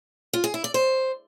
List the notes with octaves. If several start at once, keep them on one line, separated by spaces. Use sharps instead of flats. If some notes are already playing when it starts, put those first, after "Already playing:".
F4
G#4
E4
D5
C5